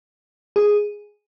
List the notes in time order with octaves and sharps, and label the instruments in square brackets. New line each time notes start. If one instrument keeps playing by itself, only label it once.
[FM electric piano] G#4